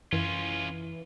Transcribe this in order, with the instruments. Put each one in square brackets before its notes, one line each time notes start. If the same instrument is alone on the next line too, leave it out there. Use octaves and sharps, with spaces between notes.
[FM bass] F#2 [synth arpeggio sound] E3 [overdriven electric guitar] C#4 F4